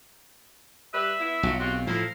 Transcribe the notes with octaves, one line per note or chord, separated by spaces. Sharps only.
G3 B4 E5
B3 E4
B1 F3 F#3
C3 C4 F4 F#4
A2 F3 E4 A#4 C5 F5